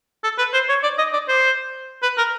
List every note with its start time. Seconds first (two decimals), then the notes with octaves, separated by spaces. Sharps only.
0.24 A4
0.38 B4
0.53 C5
0.69 C#5
0.83 D5
0.98 D#5
1.13 D5
1.28 C5
2.02 B4
2.17 A#4